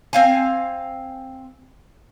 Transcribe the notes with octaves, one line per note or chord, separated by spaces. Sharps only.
C4 F5 G#5